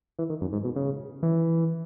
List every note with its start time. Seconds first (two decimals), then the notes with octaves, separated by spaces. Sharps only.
0.19 E3
0.30 D#3
0.41 F#2
0.53 G#2
0.64 B2
0.76 C#3
1.23 E3